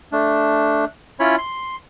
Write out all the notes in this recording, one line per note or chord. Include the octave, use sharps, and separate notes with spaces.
A3 D4
C#4 E4 F4 C#5 B5
C6